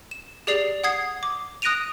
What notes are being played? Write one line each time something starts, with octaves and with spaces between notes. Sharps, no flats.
E7
G4 G#4 D5 C7 F7 F#7
F#5 D#6 G#6 C7
D6
D#6 F#6 A#6 D7 D#7 F7